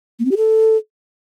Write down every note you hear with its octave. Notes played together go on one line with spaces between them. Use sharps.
A#3
C4
G4
A4